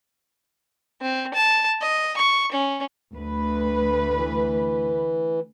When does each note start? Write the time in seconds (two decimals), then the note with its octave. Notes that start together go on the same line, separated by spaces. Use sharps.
1.02 C4
1.34 A5
1.81 D#5
2.17 C#6
2.52 C#4
3.13 D2 B4
4.13 E3